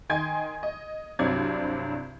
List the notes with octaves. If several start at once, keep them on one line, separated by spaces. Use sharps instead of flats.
D#3 D#5 G5 G#5 C6 G#6
D#5
C2 G2 F#3 C4 D5 G#6